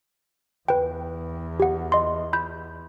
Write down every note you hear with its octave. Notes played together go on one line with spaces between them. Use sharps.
E2 B4 G5
G4 F#5
D#5 C6
B5 G6